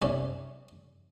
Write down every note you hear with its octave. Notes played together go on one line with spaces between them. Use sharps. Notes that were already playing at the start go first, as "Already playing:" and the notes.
B1 F#2 C3 C#4 D5 G#5